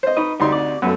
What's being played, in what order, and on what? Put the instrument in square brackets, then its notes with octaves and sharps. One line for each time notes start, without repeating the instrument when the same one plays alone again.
[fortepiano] C5 D#5
[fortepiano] D#4 [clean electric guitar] B4 D#5
[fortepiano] D2 D#4 C6 [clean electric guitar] G3
[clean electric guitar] C3 D5
[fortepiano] F#2 A3 [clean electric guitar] B2 B3